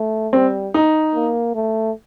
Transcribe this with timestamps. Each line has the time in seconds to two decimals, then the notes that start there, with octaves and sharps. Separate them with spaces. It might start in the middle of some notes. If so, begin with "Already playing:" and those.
Already playing: A3
0.33 G3 C4
0.74 D#4
1.15 A#3
1.55 A3